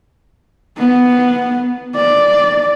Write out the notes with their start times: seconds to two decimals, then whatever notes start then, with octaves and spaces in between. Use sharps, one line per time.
0.78 B3
1.96 D5